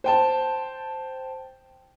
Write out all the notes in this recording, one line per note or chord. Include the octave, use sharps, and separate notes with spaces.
C5 G5 A5